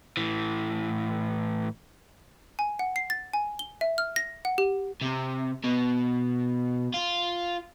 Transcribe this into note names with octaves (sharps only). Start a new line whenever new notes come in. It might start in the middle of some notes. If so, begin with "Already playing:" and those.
A2 E3
G#5
F#5
C7
A6
G#5
G7
E5
F6
A#6
F#5
G4
C3
B2
F4